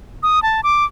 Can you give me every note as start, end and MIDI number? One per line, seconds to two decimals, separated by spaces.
0.23 0.42 87
0.43 0.61 81
0.64 0.85 86